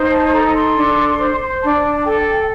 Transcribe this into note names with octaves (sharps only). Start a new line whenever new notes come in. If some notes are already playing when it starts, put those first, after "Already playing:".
Already playing: D#4 C5
A5
A5
A4 A#5
C6
D4
C5
D4 A5
A5
A4 G5